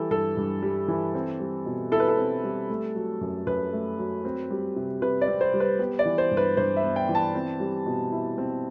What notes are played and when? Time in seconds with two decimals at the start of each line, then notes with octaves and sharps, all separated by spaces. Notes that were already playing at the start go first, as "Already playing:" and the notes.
Already playing: E3 G3 G4 A4
0.11 G2 A4
0.37 G2
0.62 G3
0.88 E3
1.14 C4
1.40 G3
1.66 B2
1.92 E4 A4
2.00 B4
2.08 A4
2.18 C4
2.43 G3
2.70 A3
2.95 F#3
3.21 F#2
3.47 F#2 B4
3.73 A3
3.98 F#3
4.25 C4
4.51 G3
4.76 C3
5.02 C3 B4
5.21 D5
5.28 C4
5.41 C5
5.54 G3
5.60 B4
5.79 B3 G4
5.99 D5
6.05 E3
6.18 C5
6.31 G2
6.37 B4
6.57 G2 C5
6.76 E5
6.83 B3
6.96 G5
7.09 E3
7.15 A5
7.35 C4
7.60 G3
7.86 B2
8.12 E4
8.38 C4